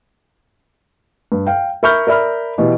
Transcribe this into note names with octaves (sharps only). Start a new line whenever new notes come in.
G2
F5 G5
A#4 E5 B5 C#6 F6 G6
A#4 D5 E5 B5 F6
B2 E3 G4